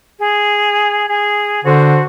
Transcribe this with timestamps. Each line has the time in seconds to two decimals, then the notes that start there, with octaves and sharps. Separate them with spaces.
0.20 G#4
1.08 G#4
1.64 D3 F#4 C5